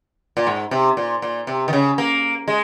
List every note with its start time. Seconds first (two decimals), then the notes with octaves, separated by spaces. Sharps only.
0.37 A#2
0.47 G#2
0.71 C3
0.97 A#2
1.22 A#2
1.47 C3
1.68 D#3
1.73 C#3
1.98 A#3
2.48 G#3